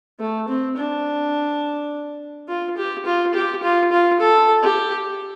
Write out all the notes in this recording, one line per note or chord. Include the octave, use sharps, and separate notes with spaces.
A3
C4
D4
F4
G4
F4
G4
F4
F4
A4
G4